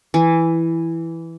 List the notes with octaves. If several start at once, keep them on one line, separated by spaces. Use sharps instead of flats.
E3